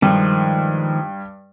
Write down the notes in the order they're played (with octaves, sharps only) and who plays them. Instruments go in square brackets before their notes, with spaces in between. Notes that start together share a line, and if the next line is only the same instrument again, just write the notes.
[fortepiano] G2 [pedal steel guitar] D#3 F3 G#3